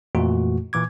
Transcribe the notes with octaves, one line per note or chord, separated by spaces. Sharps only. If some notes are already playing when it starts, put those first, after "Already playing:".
F2 A#2 E3 A3 F#4
A#2 E3 D6 G#6